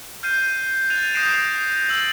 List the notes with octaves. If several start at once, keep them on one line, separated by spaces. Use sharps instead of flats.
F6 G6 C7 D#7
F#6 G#6 A6 D#7 F7
D#6 G6 A#6 C7 D7 E7
E6 A6 D7 F7 F#7